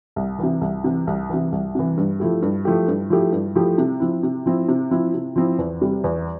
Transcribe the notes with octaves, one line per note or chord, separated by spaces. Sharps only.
C2
C3 E3
C2
C3 E3
C2
C3 E3
C2
C3 E3
G2
F3 A3 E4 G4
G2
F3 A3 E4 G4
G2
F3 A3 E4 G4
G2
F3 A3 E4 G4
C3
F3 C4 E4
C3
F3 C4 E4
C3
F3 C4 E4
C3
F3 C4 E4
E2
C3 G3
E2